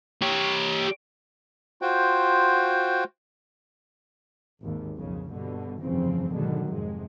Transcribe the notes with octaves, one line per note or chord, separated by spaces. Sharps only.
G4 C#5
F4 F#4 C5 G5
G#1 D#2
B1 F2 C#3
G2 B2 D3
F1 G2 C#3 E3 F3 C4
G#2 B2 D3 D#3 F#3 G#3
F2 G#2 C3 G#3